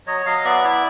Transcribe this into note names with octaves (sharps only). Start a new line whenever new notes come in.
F#3 C#5 D#5
F#3 D#5 F5
B3 D5 E5
E4 D5 E5